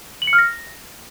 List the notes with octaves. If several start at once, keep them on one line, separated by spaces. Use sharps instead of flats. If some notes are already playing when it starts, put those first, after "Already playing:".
F#7
C#7
F6
A#6